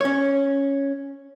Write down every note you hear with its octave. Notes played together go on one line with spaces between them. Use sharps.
C#4 C#5